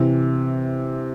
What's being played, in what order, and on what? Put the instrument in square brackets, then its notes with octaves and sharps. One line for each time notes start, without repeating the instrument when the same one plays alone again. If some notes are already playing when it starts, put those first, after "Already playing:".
Already playing: [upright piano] C3 E3